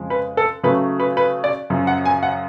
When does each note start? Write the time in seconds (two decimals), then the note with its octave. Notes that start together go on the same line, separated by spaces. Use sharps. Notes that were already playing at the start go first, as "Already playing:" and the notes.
Already playing: F2 C#3 F3 G#3
0.10 B4
0.37 A4
0.63 C#3 F#3 A3 B4
1.00 B4
1.17 B4
1.44 D5
1.70 F#2 C#3 F3
1.87 F#5
2.05 G#5
2.23 F#5